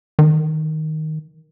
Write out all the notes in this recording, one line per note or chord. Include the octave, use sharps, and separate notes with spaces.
D#3